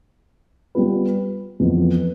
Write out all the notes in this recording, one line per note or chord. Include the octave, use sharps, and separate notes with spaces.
G3 B3 F4 B4
F2 E3 B3